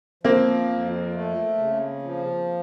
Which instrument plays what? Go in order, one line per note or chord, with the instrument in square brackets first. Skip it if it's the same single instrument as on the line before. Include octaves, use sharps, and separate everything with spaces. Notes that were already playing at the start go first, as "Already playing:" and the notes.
[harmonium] F3 [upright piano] A#3 C4
[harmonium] F2
A3
C#3
F3